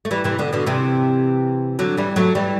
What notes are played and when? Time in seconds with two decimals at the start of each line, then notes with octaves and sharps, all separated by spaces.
0.05 A3
0.11 E3 G3
0.24 C3 E3
0.39 B2 D3
0.53 B2 D3
0.66 C3 E3
1.79 D3 F#3
1.97 E3 G3
2.16 F#3 A3
2.35 E3 G3